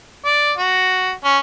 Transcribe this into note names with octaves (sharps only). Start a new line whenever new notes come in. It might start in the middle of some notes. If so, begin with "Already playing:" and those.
D5
F#4
C#4